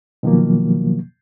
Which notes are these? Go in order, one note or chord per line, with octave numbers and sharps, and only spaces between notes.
B2 D#3 F3 F#3 A#3